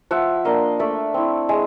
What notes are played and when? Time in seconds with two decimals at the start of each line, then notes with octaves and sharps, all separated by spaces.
0.11 F3 E5 F#5
0.45 A#3 D4 D#5 F5
0.79 A3 D5 E5
1.14 C4 E4
1.49 G#3